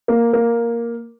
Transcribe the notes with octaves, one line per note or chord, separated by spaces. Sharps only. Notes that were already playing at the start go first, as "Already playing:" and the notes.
A#3
A#3